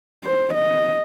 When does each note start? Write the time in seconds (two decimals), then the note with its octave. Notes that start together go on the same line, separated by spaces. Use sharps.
0.24 C5
0.54 D#5